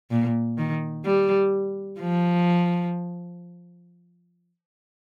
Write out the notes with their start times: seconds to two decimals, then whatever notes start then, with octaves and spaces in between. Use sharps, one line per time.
0.11 A#2
0.58 D#3
1.05 G3
2.00 F3